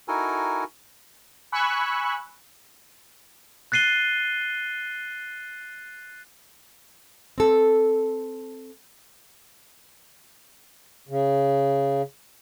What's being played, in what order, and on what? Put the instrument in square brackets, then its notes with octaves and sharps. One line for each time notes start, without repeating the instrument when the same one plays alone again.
[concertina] D#4 E4 F#4 A4 A#4 G#5
[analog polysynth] G#5 B5 C#6 E6 F#6
[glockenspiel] F#6 A6 C7 D#7 G7
[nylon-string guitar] C4 A4
[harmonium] C#3